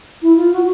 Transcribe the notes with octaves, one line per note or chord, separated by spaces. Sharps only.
E4
F4
F#4